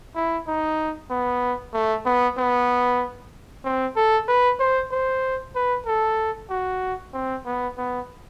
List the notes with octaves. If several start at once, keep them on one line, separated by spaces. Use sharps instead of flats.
E4
D#4
B3
A3
B3
B3
C4
A4
B4
C5
C5
B4
A4
F#4
C4
B3
B3